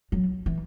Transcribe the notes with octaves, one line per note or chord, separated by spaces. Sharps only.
F#3
E3